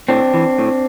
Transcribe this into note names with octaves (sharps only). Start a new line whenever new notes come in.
A2 C4 D4
E3
A2